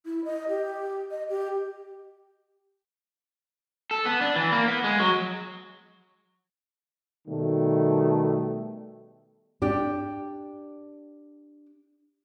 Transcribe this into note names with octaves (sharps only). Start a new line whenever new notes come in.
E4
D#5
G4
D#5
G4
A4
B3
D4
E3
A#3
B3
G#3
F#3
B2 D#3 G3 A3
D4 G4